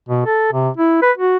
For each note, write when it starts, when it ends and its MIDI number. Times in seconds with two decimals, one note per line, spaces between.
0.09 0.22 47
0.26 0.47 69
0.52 0.69 48
0.77 0.98 64
1.02 1.12 71
1.17 1.37 66